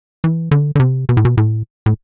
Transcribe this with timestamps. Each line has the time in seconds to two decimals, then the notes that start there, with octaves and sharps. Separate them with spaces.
0.24 E3
0.51 D3
0.75 D3
0.80 C3
1.09 B2
1.17 A2
1.25 B2
1.37 A2
1.86 A2